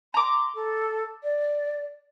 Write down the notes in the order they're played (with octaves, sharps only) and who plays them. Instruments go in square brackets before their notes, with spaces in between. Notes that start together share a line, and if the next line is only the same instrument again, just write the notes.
[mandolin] A#5 D6 [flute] C6
[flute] A4
D5